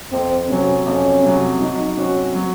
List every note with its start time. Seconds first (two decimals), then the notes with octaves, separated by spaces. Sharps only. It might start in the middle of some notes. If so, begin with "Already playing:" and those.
0.12 F2 C4
0.49 C3 F#3 C#4
0.87 F2 C#4
1.23 C3 F#3
1.61 F#3 D#4
1.97 C4 C#4 F#4
2.34 F#3